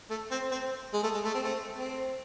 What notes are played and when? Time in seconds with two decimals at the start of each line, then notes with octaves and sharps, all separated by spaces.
0.10 A3
0.31 C4
0.52 C4
0.94 G#3
1.04 A3
1.14 G#3
1.24 A3
1.34 C4
1.44 A3
1.77 C4